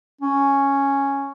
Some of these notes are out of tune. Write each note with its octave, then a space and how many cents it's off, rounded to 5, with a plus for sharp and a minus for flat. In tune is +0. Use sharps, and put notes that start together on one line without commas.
C#4 +0